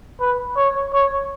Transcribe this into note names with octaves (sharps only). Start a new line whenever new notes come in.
B4
C#5
C#5